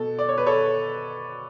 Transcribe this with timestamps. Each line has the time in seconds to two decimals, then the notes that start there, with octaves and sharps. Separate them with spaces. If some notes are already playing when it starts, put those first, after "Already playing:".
Already playing: B2 A4
0.19 D5
0.29 C#5
0.38 B4
0.46 A4 C#5